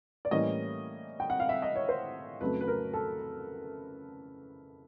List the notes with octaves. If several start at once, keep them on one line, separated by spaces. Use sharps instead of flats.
D5
A2 E3 G3 A#3 C#4 D#5
G5
F#5
F5
E5
D#5
C#5
C5
F2 C#3 F#3 A3 B4
B4
A#4
A4